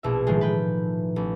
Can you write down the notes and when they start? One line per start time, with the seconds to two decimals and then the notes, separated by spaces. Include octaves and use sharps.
0.03 A#1 B2 E4 E5
0.27 A2 D#3 F3 G#3
0.41 B4 G5
1.16 A1